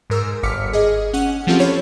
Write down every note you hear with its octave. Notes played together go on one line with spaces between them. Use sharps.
G#2 A#4 E6
G1 D6 F6 B6 C#7
G#4 D#5
C#4 F#5
F3 C4 C#4 F4 G4 A4
A4 C#5 B5